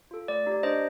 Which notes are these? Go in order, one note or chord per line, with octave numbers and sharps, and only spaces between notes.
F4 A4
A3 D5
D#4 G4
D5
D4 C5 D#5